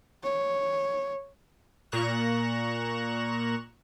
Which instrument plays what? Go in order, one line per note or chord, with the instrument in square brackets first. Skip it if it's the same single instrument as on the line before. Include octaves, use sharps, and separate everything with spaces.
[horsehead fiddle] C#5
[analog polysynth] A#2 A#5 C#6 F#6 E7